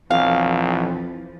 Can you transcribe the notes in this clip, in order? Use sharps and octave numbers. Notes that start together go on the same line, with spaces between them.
B1 F2 E3 F3 F5